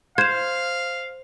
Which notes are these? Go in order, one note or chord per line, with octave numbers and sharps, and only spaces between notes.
C5 F5 G#6 E7